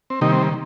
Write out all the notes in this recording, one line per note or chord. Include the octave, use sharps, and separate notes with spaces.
C4
C3 D#3 G3 A#3 D#4
C4
A#3